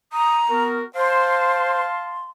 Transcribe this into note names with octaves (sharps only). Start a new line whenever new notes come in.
A#5 D#6
B3 F#4 A#4
C5 F5 A5 C6